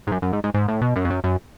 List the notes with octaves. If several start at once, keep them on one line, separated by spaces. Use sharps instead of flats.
G#2
F#2
F#2
G#2
G#2
G#2
A2
B2
F#2
F2
F#2
F#2